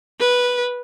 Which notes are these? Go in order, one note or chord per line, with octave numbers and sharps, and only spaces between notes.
B4